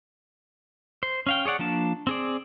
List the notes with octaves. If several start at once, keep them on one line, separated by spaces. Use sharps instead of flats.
C5
C#4 F5 G5
G#4 C#5 D5 F#5
F3 A#3 D4 A5
C4 G#4 D5